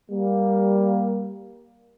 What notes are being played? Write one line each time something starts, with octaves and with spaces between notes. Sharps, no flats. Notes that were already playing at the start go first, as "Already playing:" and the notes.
G3 A#3